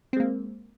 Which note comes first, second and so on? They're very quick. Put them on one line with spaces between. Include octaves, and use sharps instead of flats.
C4 G#3 A#3